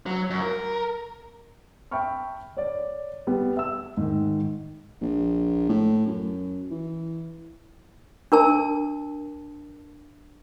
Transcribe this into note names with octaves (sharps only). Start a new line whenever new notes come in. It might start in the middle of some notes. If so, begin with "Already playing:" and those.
F#3
F#2
A#4
E5 G5 A5 B5 C#6 F6
C#5 D5
G3 B3
E5 E6
G#2 D#3
A#1
A2
F#2
E3
D4 A#4 A5